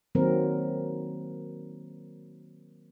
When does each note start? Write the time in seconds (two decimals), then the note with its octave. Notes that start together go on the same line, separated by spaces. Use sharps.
0.15 D#3 F#3 A#3 C4 A#4